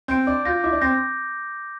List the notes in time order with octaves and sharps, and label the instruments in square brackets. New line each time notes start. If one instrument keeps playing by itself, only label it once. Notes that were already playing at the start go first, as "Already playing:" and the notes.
[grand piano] C4 [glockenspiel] G6 D7
[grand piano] D4 [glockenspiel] D6
[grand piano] F4 [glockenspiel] G6 A#6
[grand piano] E4 [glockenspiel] D6
[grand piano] D4
[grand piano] C4 [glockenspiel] G6 A#6